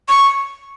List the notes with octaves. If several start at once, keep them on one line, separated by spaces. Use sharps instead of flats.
C#6